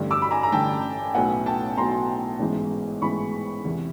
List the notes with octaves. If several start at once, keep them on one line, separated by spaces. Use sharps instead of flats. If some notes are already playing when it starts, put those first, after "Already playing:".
Already playing: A1 G2 D3
D6 E6
B5
G#5 A#5
A#5
A1 G2 D3 G5 A5
B1 A2 F#3 B3 F#5 G#5
G5 A5
B1 A2 F#3 B3 A#5 C6
A1 G#2 E3 G#3 B3
A1 G#2 E3 G#3 B3 B5 C#6
E2 C3 E3